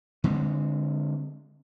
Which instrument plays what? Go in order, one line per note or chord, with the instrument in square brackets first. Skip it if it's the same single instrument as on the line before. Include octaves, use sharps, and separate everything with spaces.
[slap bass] D3 G#3 C4